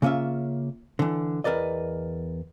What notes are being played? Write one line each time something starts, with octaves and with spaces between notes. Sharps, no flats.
C#3 A#3 C#4 F4 E5
D3 E3
E2 A#4 B4 D5 D#5